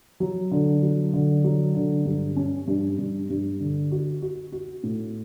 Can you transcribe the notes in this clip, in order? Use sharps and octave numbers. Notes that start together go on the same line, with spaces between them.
F#3
D3
F#3
D3
F#3
D3
G2
C#4
G2
G2
G2
D3
F#4
F#4
F#4
A2